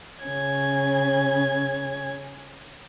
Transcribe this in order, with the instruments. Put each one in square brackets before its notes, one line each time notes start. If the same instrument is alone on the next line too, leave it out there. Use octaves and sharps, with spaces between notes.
[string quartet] C#3 C#4 G#6